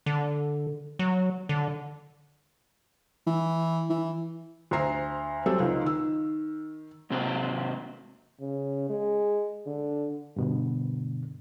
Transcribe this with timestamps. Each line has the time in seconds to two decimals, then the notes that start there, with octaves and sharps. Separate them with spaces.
0.06 D3
0.99 F#3
1.49 D3
3.26 E3
3.89 E3
4.71 D2 C5 A#5 C7
5.46 F#3 G3 C4 A4
5.59 C#2 D#4
5.82 D#3 E6
7.10 G#2 C3 F#3 G#3 C4 C5
8.40 C#3
8.89 G#3
9.66 D3
10.36 G2 B2 D3